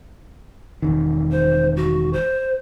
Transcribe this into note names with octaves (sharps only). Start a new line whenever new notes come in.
E1 D#3
C5
F#4
C5